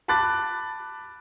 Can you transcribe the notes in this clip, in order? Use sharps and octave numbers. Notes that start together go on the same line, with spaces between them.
A5 B5 D6 F#6 A6